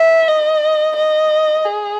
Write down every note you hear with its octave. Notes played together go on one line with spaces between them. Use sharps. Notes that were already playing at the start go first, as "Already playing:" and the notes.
Already playing: E5
D#5
D#5
G#4